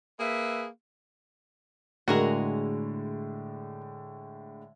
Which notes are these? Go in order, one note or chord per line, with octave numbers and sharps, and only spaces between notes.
A#3 G#4 B4 E5
A2 D3 G#3 F#4 G#4 A#4